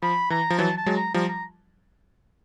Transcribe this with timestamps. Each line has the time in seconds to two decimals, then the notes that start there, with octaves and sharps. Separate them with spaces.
0.02 F3 B5
0.30 E3 A#5
0.50 F3
0.58 E3 F#3 A5
0.78 A5
0.86 F#3 G#3
0.97 A#5
1.14 F3 G3 A#5
1.29 A#5